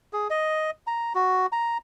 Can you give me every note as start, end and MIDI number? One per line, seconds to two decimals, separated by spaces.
0.13 0.28 68
0.30 0.71 75
0.87 1.13 82
1.15 1.46 66
1.52 1.78 82